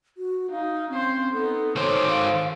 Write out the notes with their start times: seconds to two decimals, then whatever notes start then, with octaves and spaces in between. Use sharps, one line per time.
0.17 F#4
0.51 D#4 F5
0.90 C4 C#4 C5
1.33 B3 D#4 A4
1.76 D#3 A4 C5 C#5 D6
2.08 F5